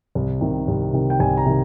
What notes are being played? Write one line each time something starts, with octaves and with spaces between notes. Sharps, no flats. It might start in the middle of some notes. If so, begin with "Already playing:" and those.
C2
C3 D#3
C2
C3 D#3
G5
C2 G#5
A#5
C3 D#3